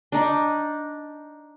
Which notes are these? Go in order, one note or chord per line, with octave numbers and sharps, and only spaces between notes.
D4 D#4